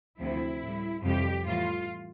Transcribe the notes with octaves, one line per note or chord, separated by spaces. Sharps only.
D2 C3 F3 E4
A2 G3
F2 C3 E3 G3 G4
A2 E3 G3 F4